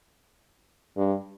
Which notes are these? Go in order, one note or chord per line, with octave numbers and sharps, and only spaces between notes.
G2